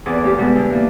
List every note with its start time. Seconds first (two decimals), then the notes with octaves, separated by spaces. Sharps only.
0.06 E2 E3 C4 G#4 D5 D6
0.22 D2 G2 G4
0.38 B2 G3 G#3 B3
0.56 D3
0.70 E3 A#3 D4